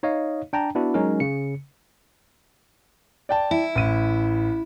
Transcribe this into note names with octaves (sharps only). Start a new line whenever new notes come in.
D#4 C#5 D#5 F5
D4 G5 A5 A#5
B3 D4 E4 F#4
F#3 G#3 C#4 D#4 A#4
C#3 C#7
D5 G5 A5
E4
A1 D#7